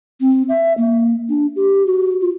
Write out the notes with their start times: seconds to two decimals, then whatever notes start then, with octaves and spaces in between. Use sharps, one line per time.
0.21 C4
0.49 E5
0.78 A#3
1.29 D4
1.56 G4
1.87 F#4
2.21 F4